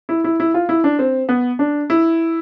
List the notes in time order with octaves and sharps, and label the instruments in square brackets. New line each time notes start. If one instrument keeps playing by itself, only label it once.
[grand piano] E4
E4
E4
F4
E4
D4
C4
B3
D4
E4